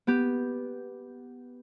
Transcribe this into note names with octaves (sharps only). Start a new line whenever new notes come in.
B3 G4